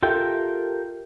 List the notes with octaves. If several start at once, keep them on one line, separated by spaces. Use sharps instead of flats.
F4 G4 A4 A#4 E5 G5